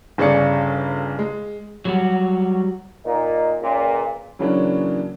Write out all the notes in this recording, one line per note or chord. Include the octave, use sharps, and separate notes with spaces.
G1 C#3 G#4 D5 C#7
G#3
F#3 G3 F#4
A#2 D#4
C#2 A#2
C#3 E3 F#3 A#3 C#4 D4